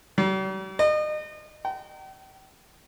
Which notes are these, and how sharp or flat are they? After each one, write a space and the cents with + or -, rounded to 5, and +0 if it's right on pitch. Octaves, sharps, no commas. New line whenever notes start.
G3 -45
D#5 -35
G5 -40